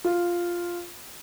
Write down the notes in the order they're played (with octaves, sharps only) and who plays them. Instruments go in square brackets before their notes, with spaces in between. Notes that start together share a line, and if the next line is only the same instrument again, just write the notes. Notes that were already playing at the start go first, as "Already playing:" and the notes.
[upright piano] F4